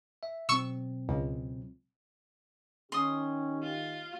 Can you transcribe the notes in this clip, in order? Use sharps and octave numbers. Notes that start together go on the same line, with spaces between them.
E5
B2 F#3 C4 C#6 E6
C#2
D#3 C#4 D#4 G4 C6 D#6
F4